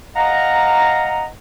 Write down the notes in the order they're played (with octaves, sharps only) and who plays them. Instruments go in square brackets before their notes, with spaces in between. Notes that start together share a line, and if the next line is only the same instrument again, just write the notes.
[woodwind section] D#5 F5 F#5 A#5